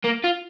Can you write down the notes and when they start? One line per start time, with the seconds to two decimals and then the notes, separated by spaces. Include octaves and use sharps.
0.05 A#3
0.24 F4